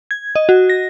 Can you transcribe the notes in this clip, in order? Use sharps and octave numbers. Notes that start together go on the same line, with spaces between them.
G#6
D#5
F#4
A#6